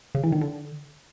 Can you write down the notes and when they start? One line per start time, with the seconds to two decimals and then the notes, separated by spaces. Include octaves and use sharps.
0.15 C#3
0.24 E3
0.32 D#3
0.41 D3